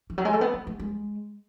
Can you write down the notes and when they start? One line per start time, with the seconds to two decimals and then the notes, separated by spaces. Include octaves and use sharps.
0.10 E3
0.18 F#3
0.25 G#3
0.33 A3
0.41 B3
0.54 B3
0.67 A3
0.79 G#3